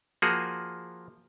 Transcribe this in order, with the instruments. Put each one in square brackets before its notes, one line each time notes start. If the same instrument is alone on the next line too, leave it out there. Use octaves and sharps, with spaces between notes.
[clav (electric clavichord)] F3 A#3 F#4 G#4